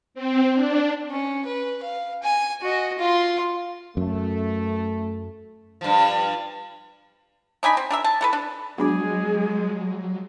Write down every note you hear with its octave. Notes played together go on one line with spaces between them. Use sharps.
C4
D4
C#4
B4
F5
G#5
F#4 D#5
F4 C6
F#2 A3
G2 F3
D4 D#4 G#5 B5
C4
D4 A#4 E5
A5
E3 A4 B4
D4
F#3 G#3 B3 D4 F#4 G#4